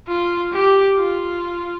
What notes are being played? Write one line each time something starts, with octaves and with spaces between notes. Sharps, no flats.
F4
G4
F4